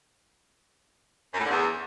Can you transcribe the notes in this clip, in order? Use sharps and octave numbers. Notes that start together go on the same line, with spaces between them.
F#2
A2
D3
E2